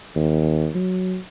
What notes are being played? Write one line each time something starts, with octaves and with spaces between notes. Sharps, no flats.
D#2
F#3